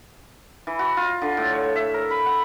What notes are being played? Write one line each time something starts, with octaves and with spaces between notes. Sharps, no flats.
E3
F#4
F4
D3
A2
C#5
E5
A#4
B5
F#5